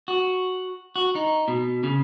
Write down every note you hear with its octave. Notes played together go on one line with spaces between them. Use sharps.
F#4
F#4
D#4
B2
C#3